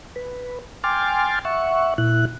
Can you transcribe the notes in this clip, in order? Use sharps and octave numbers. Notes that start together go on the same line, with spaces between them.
B4
G5 G#5 C6 D6 F6 A6
E5 F#5 C#6
A#2 E4 F#6